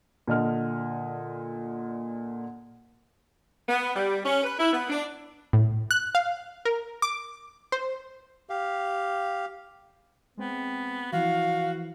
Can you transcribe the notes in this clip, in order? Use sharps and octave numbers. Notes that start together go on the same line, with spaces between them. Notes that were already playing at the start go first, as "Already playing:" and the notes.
A#2 D3 D#5 F6
B3
G3
C#4
B4
E4
B3
D4
A2
F#6
F5
A#4
D6
C5
G4 F5
G#3 B3 C4 G5
E3 F3 E4 F#4 F5